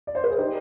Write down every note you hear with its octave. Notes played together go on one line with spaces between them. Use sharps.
D5
C5
B4
G#4
D#4 G4